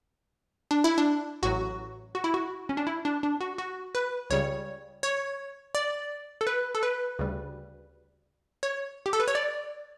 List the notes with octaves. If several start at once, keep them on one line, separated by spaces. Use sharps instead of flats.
D4
E4
D4
A1 A2 F#3 F#4
F#4
E4
F#4
C#4
D4
E4
D4
D4
F#4
F#4
B4
C#2 C#3 G3 C#5
C#5
D5
A4
B4
A4
B4
D2 C#3 G3
C#5
G4
A4
B4
C#5
D5